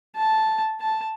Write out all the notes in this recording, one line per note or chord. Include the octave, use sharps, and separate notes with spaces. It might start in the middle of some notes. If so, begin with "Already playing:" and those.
A5
A5